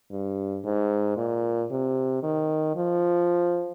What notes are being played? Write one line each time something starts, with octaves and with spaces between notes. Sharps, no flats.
G2
G#2
A#2
C3
D#3
F3